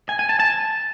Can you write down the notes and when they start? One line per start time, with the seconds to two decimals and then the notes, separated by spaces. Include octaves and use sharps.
0.09 G#5
0.19 G#5
0.29 A5
0.40 A5